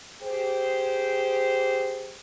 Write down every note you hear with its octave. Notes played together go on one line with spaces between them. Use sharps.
G4 G#4 C5